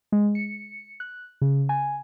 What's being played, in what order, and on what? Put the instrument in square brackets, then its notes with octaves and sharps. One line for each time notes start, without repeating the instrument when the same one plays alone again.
[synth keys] G#3
C#7
F#6
C#3
G#5